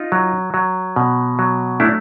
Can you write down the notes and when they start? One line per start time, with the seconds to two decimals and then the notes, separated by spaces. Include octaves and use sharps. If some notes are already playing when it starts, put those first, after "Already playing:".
Already playing: D#4 F4
0.12 F#3
0.54 F#3
0.96 B2
1.39 F#3
1.80 A3 D4 E4